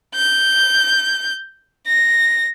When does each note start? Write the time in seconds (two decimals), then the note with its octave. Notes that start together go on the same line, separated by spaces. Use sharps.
0.15 G6
1.87 A#6